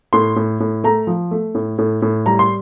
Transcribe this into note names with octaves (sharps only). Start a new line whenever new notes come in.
A2 C6
A2
A2
A3 A#5
F3
A3
A2
A2
A2
G3 A#5
C6